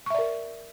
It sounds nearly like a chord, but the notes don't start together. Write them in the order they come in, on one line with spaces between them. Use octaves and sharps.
C#6 E5 D5 A#4